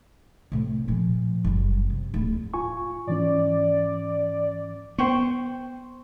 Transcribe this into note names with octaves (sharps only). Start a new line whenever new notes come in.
A2 C3
A#2 F3
F#1 G3
C3
D1
F4 G#5 C#6
G#2 E3 C#4 D5
B3 C5 G5 C#6